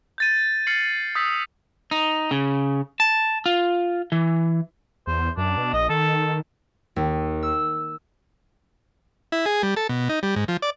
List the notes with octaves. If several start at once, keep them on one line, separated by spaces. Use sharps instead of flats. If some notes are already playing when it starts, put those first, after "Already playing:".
G6 A6 D#7
F6 A6 C7 C#7 F#7
D#6 E6 G6 B6
D#4
C#3
A5
F4
E3
E2 C5
F#2 D4
B2
A#1 D#5
D#3 A4
D#2
E6
E4
G#4
G3
A4
B2
D#4
G3
G#2
F3
D5